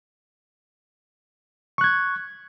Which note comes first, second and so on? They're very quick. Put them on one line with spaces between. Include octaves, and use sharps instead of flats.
C#6 F#6 G#6